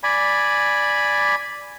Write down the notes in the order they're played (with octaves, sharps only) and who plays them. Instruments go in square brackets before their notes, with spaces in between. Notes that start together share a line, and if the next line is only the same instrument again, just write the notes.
[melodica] D5 G#5 B5